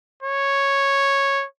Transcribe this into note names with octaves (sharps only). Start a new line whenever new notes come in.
C#5